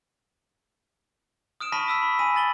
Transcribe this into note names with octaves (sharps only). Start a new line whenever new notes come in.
D#6 F6 D7 E7
A5 B5 C#6 A#6 B6 D#7
D#6 E6 B6
B5 C#6
G#5 B5 A#6 D#7
A6 F#7 G7